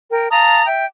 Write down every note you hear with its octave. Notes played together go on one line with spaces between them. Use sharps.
A#4 G5
F5 A5 A#5 D#6
E5 G5